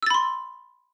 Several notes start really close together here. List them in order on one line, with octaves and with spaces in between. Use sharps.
E6 A6 B5 C6